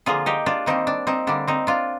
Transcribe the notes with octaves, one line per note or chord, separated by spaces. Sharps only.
D3 F3 A#3 F4 G#4
D#4 G4
D4 F4
D#3 G3 A#3 C4 D#4
D4
C4 D#4
D3 G3 A#3 D4
C4 D#4
D4 F4